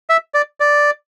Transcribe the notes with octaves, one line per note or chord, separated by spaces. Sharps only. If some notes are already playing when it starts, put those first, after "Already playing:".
E5
D5
D5